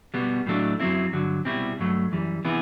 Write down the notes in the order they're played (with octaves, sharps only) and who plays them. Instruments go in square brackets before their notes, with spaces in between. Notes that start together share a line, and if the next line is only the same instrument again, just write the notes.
[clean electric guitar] B2 G3 B3
A2 F#3 A3 D4
F#2 F#3 C4 E4
G2 D3 F#3
C2 B2 G3 C4 E4
G2 F#3 A3
F#2 E3 G3
C3 E3 B3 E4